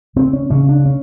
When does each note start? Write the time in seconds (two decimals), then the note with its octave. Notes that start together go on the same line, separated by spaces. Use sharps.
0.16 C#3 C4
0.33 C#4
0.50 C#3 C#4
0.69 D4
0.86 C#4